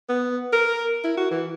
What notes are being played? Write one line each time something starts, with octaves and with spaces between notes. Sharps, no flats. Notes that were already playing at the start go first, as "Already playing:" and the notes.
B3
A#4
E4
F#4
E3